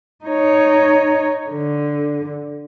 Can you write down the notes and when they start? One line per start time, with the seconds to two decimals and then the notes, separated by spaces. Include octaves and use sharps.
0.25 D#4 C#5
1.50 D3